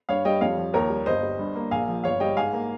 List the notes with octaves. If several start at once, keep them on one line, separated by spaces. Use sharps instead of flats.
G2 C#5 F5
G3 D#5 G5
F2 C#5 F5
F3
D#2 A#4 C#5
G3
G1 C5 D#5
G3
G2
A#3
A#1 F5 G#5
F3
G1 C#5 F5
G3 D#5 G5
G#2 F5 G#5
A#3